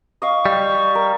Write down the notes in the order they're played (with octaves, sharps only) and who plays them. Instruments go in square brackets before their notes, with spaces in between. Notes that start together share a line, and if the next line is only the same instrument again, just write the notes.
[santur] D#5 F5 [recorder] C#6
[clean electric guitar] G3
[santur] A#4